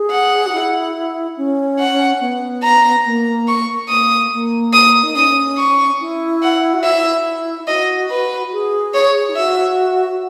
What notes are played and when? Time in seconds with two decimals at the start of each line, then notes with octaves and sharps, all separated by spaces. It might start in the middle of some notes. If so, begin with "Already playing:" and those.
Already playing: G#4
0.11 F#5
0.46 F#4
0.52 E4
1.37 C#4
1.79 F#5
2.20 B3
2.63 A#5
3.06 A#3
3.48 C#6
3.89 A#3 D#6
4.32 A#3
4.73 D#6
5.03 D#4
5.15 C#4 D#6
5.58 C#6
6.00 E4
6.42 F#5
6.74 F#4
6.84 E4 E5
7.67 F#4 D#5
8.10 B4
8.52 G#4
8.94 C#5
9.29 E4
9.36 F#4 E5